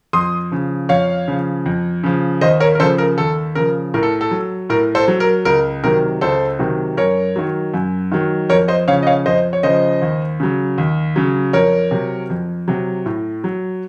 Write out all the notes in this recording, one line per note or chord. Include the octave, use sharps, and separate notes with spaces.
F2 C6 D#6
C#3 F3
F2 C#5 F5
C#3 F3
F2
C#3 F3
D#2 C5 D#5
A#4 C#5
A#4
C#3 F3 A4 C5
A#4
D#2 A4
C#3 F3 A#4
A2 A#4
A4
A4
F#3
A2 A#4
A4 C5
F#3
A#4
C#2 A#4
C3 D#3 F#3 A#4
C#2 A4 C5
C3 D#3 F#3
F#2 A#4 C#5
D#3 F#3
F#2
D#3 F#3
F2 A#4 C#5
C5 D#5
C#3 F3 C#5 F5
D#5
C#5 F5
F2 C5 D#5
C#5
C#3 F3 C5 D#5
D#2
C#3 F#3
D#2
C#3 F#3
F2 A#4 C#5
C3 F#3
F2
C3 F#3
A2
F#3